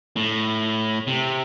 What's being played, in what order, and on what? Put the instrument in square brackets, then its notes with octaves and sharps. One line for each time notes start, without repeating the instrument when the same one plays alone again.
[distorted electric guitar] A2
C3